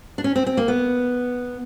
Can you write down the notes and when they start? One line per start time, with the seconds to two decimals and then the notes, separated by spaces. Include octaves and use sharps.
0.18 D4
0.24 C#4
0.36 C4
0.46 C4
0.57 A#3
0.68 B3